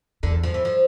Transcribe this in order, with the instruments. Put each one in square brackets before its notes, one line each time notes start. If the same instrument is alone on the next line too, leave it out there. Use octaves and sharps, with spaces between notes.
[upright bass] E2 [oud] D3
[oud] F3
E3
F3